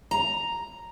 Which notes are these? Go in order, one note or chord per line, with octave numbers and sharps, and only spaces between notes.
A#5